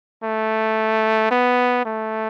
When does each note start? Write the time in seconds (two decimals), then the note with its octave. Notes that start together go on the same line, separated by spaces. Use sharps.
0.23 A3
1.31 B3
1.85 A3